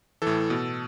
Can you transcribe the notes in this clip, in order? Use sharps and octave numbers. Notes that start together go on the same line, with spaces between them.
A2 E3 A4
B2